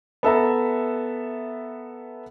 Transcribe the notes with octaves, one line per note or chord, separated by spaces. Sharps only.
B3 A4 E5 A#5